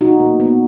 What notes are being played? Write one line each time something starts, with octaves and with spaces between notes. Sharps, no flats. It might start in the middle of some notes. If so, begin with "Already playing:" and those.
B2 D#4 F#4
B2 A#3
A#3 B3